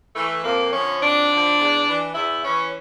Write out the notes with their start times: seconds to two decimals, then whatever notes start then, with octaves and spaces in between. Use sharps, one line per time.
0.15 E3 A3
0.44 F2 A#3
0.73 D3 F3 C#4
1.01 F2 D4
1.30 D3 F3
1.59 E2
1.88 E3
2.15 E2 E4
2.44 E3 C#4